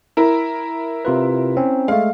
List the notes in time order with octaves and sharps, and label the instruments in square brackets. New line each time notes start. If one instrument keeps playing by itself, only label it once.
[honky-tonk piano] E4 A#4
[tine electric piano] C3 F4 B4
C4 C#4
[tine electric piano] G#3 A3 [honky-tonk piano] F5